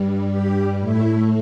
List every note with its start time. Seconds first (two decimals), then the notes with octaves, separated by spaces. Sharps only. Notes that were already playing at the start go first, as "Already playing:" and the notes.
Already playing: G2 G3
0.29 G4
0.79 A2 A3 E4